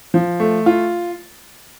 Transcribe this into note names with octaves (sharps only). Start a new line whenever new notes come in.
F3
A3
F4